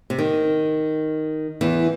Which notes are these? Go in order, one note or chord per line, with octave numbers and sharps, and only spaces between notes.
C3
D#3
E2 E3